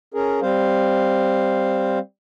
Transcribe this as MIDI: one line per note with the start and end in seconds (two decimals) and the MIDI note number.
0.14 0.40 61
0.14 0.40 68
0.14 0.40 70
0.42 1.99 55
0.42 1.99 60
0.42 1.99 72
0.42 1.99 77